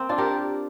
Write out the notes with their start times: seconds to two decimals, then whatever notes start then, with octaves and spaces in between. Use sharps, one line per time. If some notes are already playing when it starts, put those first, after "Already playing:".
Already playing: A#3 C4
0.09 D4 F4
0.18 G4 A#4